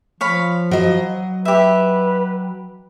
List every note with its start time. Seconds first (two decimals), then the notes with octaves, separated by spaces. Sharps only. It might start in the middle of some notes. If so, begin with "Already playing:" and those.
0.21 F3 C#5 F5 B5
0.71 F#3 D#5
1.45 G4 B4 E5